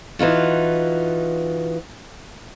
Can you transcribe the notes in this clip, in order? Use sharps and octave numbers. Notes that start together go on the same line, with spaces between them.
E3 D#4 F4 F#4